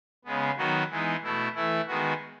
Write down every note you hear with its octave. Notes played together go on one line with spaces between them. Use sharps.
C#3 G#3 B3
D#3 F#3 B3 D#4 F#4
E3 G#3 B3 D#4
B2 A3 E4
E3 A3 E4
D#3 G#3 B3 F#4